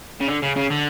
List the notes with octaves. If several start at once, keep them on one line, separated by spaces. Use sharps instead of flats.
C#3
D3
C#3
C#3
D3